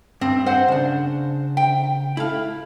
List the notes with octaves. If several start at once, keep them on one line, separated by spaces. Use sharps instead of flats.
G2 C4
C5 F#5
C#3 D4
G5
E4 A4 F5